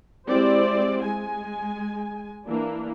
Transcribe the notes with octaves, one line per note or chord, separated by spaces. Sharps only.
G#3 C4 E4 G4 C5 D5
G#3 G#5
E3 A#3 D4